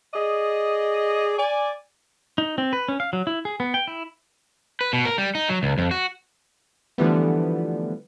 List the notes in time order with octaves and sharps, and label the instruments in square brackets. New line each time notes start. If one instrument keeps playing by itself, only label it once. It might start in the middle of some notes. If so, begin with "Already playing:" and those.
[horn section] G#4 D5 D#5
D5 G#5
[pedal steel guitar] D#4
C4
B4
C#4
F5
F#3
E4
G#4
B3
G5
E4
[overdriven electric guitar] B4
B2
A#4
G3
D#4
F#3
C#2
F2
F#4
[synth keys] D3 E3 F3 G3 A3 B3